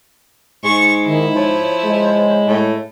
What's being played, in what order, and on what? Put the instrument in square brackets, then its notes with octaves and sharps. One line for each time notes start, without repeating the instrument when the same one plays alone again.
[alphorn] G#2 [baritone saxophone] G#3 [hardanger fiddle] C#6
[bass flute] D#3 [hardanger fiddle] E4
[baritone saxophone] F3 [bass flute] C#5
[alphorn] G#3
[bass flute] C#5
[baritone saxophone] A2